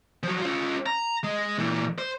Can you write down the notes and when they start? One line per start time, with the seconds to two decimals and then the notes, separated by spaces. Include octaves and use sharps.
0.23 F3 F#3
0.42 C#4 F4
0.86 A#5
1.24 G#3
1.58 A#2 E3
1.98 C5